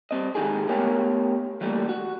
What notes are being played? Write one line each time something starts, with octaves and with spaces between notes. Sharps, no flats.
G3 C4 D#5
G#2 D#3 B3 D#4 G4 G#4
A3 B3 G4 A#4 C#5 G5
E3 G3 A3 A#3
F#4